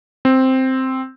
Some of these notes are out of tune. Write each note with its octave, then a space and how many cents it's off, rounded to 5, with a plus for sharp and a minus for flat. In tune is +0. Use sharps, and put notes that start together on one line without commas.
C4 +0